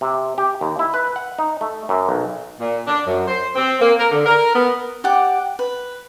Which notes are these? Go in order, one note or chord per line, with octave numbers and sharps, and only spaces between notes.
C3
G4
D#2
E4
B4
F#5
D#4
A3
F#2
B1
A#2
D4
F#2
C5
C4
A#3
A#4
D3
A#4
B3
G4 D5 F#5
B4